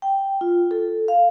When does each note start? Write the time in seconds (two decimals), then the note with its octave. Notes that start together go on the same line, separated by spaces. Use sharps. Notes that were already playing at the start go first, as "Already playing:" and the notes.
0.02 G5
0.41 F4
0.71 A4
1.08 F5